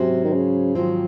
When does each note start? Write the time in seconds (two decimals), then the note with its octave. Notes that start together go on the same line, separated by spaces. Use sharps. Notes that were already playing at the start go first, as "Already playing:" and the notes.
Already playing: G#2 C3 F#3 C#4 F#4 C5
0.24 D#3
0.33 C#3
0.75 G#2 D#3 F3 F#3 C4